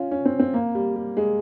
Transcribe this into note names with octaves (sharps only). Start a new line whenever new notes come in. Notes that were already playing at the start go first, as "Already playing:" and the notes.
Already playing: C#4 F4
C#4
C4
C4
A#3
G3
G3
G#3